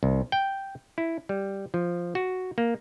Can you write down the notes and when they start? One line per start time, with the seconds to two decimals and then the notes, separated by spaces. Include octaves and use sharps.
0.03 C2
0.32 G5
0.98 E4
1.29 G3
1.74 F3
2.15 F#4
2.58 A#3